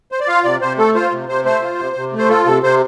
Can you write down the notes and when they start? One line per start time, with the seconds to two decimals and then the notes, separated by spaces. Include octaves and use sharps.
0.12 C5
0.20 D5
0.28 F4 F5
0.44 C3 D5
0.61 C3 C5
0.78 A3 A4
0.95 F4 C5
1.12 C3
1.29 C3 C5
1.45 A3 C5
1.62 F4
1.79 C3
1.96 C3
2.13 A3
2.18 C5
2.29 F4 A4
2.46 C3 A4
2.63 C3 C5